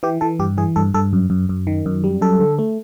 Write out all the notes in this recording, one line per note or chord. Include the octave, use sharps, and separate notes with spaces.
E3 G4
E3 A4
G2 G4
E3 G#4
G2 A4
G2 A4
F#2
F#2
F#2
D#3
F#2
G3
F#2 A4
D3
A3